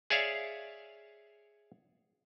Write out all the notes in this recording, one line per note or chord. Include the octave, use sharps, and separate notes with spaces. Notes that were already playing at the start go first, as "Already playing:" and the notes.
G#4 C#5 D5 E5 F5